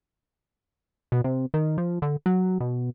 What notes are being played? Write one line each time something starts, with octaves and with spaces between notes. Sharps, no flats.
B2
C3
D#3
F3
D3
F#3
B2